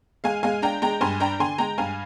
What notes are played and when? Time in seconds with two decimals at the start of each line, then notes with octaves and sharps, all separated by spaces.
0.24 G#3 F5 G#5
0.43 G#3 F5 G#5
0.62 D4 G5 A#5
0.82 G#3 G5 A#5
1.01 G2 G#5 C6
1.20 D4 G5 A#5
1.39 D3 G#5 C6
1.58 G#3 G5 A#5
1.78 G2 F5 G#5